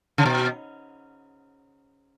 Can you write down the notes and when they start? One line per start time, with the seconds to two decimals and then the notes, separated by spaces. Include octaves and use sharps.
0.18 C#3
0.26 B2